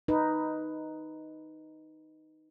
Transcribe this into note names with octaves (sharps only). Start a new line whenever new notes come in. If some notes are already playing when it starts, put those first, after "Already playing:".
D#4 B4